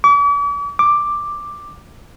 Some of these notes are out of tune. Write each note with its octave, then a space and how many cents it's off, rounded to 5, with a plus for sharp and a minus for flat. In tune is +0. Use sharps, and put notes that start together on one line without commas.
D6 -45
D6 +5